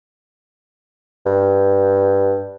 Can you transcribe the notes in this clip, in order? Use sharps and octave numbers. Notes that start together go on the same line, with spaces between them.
G2